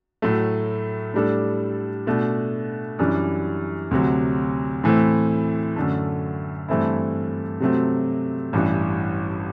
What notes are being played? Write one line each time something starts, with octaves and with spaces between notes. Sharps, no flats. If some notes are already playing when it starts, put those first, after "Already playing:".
A2 F#3 A3
A2 G3 D4 A4
B2 A3 D4
F#2 E3 G3 D4
D2 C3 F#3
A2 E3 A3 C4
F#2 D3 A3
G2 E3 A3 C4 E4
C3 F#3 A3 C4
A1 G2 E3